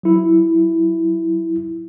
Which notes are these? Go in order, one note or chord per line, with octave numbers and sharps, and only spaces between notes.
F#3 E4